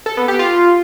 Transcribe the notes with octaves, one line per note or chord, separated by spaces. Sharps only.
A4
B3
G4
F4